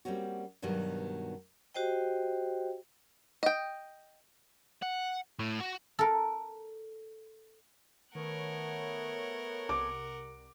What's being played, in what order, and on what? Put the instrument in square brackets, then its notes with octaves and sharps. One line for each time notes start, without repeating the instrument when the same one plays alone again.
[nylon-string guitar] G3 A#3 C4 C#4 F#4
G2 B2 D#3 F#3 G3
[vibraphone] F#4 G4 C5 D#5 G5
[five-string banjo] D#5 G5
[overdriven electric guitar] F#5
A2
F#4
[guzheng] A4 A#4
[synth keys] D#3 [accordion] A3 B3 C#5 [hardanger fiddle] A#4 F#5
[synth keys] C2 C3 [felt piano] D6